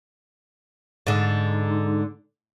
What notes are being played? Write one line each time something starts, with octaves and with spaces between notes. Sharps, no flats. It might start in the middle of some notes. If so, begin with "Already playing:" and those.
G#2 D3